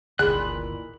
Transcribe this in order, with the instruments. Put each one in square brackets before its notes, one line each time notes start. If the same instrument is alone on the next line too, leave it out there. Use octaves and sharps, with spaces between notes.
[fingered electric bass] G1 D2 [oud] A#2 D#3 E3 [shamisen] G#4 [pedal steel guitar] B5 F#6